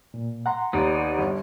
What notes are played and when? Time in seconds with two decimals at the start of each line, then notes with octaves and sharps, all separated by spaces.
0.14 A#2
0.46 F#5 A#5 C6
0.73 D#2 B3 D#4 D5
1.19 G1